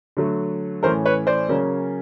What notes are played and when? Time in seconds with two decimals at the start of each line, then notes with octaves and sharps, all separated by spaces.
0.17 D3 F#3 A3
0.83 A2 E3 A3 C#4 A#4 C5
1.06 B4 C#5
1.27 C5 D5
1.49 C#3 F#3 A#3 C#4